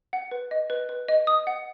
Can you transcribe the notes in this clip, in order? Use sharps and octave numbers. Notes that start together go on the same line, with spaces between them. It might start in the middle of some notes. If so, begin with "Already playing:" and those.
F#5
B4
D#5
B4
B4
D#5
D#6
F#5